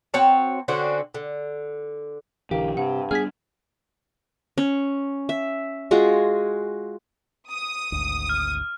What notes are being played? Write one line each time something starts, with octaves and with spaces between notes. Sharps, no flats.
C4 F#4 C#5 A5
D3 C4 C#4 F#4
D3
B1 D3 E3 A#3 G4
G2 C3 F#5
G3 B3 D4 G#4 F6 G#6 B6
C#4
E5
G#3 F4 F#4 G#4
D#6
G#1 D2
F6